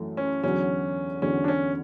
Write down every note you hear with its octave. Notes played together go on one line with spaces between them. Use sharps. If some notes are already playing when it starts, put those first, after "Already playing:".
Already playing: F#2 E3 A3
C#4
E2 D3 F#3 C#4
E2 D3 F#3 C#4
D4
C#4